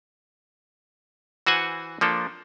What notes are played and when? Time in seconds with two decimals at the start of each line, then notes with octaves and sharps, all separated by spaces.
1.47 E3 F#4 C5 F#5 G#5
2.01 F3 A#3 D4 A4